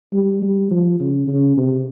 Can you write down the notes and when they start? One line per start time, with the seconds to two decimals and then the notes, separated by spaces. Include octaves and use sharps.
0.13 G3
0.42 G3
0.71 F3
1.00 C#3
1.27 C#3
1.57 C3